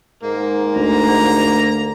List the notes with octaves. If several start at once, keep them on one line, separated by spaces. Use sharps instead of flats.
G#2 A#3
D2 A#5